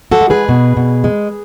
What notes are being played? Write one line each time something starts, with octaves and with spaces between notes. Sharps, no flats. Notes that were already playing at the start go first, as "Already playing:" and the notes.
F#4 A4
G#3
G#4 B4
B2
B2
G#3